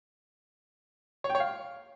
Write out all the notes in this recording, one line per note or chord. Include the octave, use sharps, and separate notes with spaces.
C#5
G5
C#5
F5